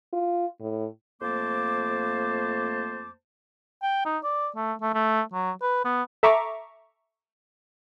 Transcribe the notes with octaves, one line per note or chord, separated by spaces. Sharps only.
F4
A2
F2 A3 A#3 C5 A5 D6
G5
D#4
D5
A3
A3
A3
F#3
B4
B3
A4 E5 A#5 C#6 D6